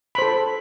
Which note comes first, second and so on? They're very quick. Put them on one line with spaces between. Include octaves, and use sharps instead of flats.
B5 C5 A4